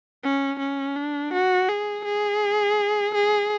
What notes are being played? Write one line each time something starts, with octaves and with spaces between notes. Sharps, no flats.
C#4
C#4
D4
F#4
G#4
G#4
G#4